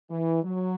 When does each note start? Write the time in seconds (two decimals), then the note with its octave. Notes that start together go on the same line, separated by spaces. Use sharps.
0.10 E3
0.43 F#3